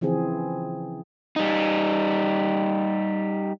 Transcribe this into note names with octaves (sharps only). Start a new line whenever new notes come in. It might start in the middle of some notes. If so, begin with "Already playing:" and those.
C#3 E3 F3 C4 G#4
G3 D#4